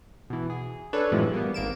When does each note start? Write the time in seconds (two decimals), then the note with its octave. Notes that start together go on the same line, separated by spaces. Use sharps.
0.30 B2 E3
0.50 G#4
0.93 D4 A4 B4 C#5 D5
1.12 F#2 A2 C3 E3 F3 G#3
1.32 G3 A#3 B3
1.54 G#1 A#3 D7 E7